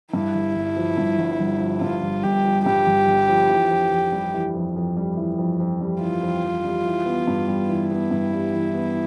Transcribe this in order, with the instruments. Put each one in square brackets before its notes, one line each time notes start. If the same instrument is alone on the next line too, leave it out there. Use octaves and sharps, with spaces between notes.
[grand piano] G2 [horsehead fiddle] E4
[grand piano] G1
G1
F3
G2
G1
G1
F3
[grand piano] G2 [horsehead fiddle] F4
[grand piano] G1
[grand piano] G1 [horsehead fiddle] G4
[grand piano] F3
[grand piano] G2 [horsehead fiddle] G4
[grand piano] G1
G1
F3
E3
F2
F2
G3
E3
F2
F2
G3
E3
F2
F2
G3
[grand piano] E3 [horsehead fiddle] F4
[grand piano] F2
F2
G3
E3
B3
G2
G3
[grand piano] E3 [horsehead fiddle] E4
[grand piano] B3
G2
G3
E3
B3